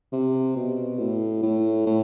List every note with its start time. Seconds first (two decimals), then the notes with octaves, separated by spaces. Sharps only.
0.13 C3
0.56 B2
0.99 A2
1.43 A2
1.86 A2